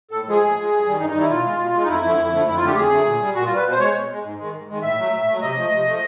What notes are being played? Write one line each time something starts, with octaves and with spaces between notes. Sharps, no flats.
A2 A4
F3 G#3 G#4
A2
F3 G#3
G2
D#3 G3
G2 D#4
D#4
D#3 G3 E4
B2 F4
G#3
B2
G#3
D#4
F2 E4
D3 F3 A3
F2
D3 F3 A3
F2 E4
F4
D3 F#3 A3 G4
F2 G#4
D3 F#3 A3
A#2
G3
A#2 F#4
F4
G3
B4
B2
C5
G#3 C#5
B2
G#3
G#2
D#3 G#3
G#2
D#3 G#3
A2 E5
F#3 A3
A2
F#3 A3
C3 D#5
F3 A3
C3
F3 A3